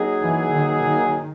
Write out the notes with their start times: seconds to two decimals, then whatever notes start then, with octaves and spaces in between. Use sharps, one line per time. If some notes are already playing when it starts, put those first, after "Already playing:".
Already playing: F#3 A#3 D#4 G#4
0.22 E3
0.51 D#3
0.82 D#3